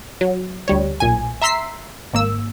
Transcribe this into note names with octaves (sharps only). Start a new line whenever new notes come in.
F#3
D2 G3 C#5
B1 A#2 G#5
E5 A#5 C6 E6 B6 C7
G#1 A#3 E6